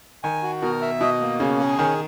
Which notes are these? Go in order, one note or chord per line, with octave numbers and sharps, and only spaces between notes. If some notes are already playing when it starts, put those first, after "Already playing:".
D#3 G#5
F#4
B2 A#4
E5
B2 D#5
A#3
C#3 C#4
G#4
D#3 C#4